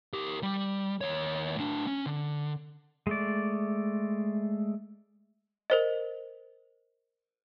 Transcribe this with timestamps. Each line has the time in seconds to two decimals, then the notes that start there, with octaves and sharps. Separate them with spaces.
0.14 G4 A#4
0.43 G3
1.01 D#2 C#5
1.56 A2 D4
1.87 C#4
2.06 D3
3.07 G#3 A3 D5
5.70 A#4 C5 D#5